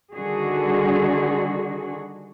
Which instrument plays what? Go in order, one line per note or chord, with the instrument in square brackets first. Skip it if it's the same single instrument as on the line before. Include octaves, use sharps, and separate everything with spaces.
[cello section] D3 D#3 G3 F#4 G#4